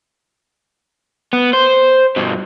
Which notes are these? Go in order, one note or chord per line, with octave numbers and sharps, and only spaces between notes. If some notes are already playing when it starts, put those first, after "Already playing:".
B3
C5
G2 B2